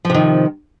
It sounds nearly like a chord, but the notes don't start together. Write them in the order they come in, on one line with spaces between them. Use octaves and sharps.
F3 C3 D#3